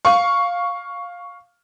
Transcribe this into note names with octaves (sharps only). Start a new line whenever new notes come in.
F5 C#6